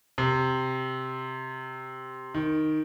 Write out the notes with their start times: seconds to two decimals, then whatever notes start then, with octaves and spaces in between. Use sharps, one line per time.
0.18 C3
2.34 D#3